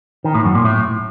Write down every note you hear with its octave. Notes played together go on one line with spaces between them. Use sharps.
D#3
A2
F#2
A#2
A2